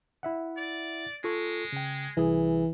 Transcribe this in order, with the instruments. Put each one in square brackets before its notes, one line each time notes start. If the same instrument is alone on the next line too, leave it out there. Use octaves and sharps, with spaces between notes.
[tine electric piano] E4 E5 F#5
[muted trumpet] D5
[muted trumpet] G#3 [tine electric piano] F4 A4 C#6
[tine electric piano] C#3 G5
[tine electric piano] C2 G#4 [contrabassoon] E3